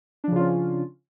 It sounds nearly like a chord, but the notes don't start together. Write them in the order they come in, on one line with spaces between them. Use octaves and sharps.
D4 F3 C#3 F4 C#4